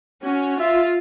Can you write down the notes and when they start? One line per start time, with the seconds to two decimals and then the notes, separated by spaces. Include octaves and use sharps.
0.23 C#4 F#4
0.60 F4 E5